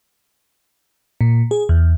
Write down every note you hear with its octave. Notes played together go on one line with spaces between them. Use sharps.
A#2
G#4
E2